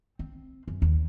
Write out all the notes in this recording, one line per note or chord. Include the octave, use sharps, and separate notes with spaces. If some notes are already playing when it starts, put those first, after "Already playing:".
C4
F#2
D#2